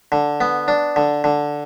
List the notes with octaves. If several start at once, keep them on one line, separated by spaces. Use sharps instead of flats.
D3
B3
D4
D3
D3